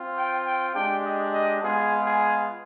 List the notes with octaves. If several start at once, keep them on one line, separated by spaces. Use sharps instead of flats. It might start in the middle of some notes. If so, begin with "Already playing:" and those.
Already playing: C4 F4
G5
G5
G#3 D4 G4 G5
D#5
D#5
G#3 B3 F4 G#4
G#4